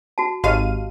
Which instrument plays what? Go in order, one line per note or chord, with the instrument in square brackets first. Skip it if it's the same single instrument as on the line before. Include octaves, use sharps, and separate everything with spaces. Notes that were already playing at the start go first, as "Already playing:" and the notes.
[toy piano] F#4 A5
[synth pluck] G#1 F5 D#7 [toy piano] F#4 G4 D#5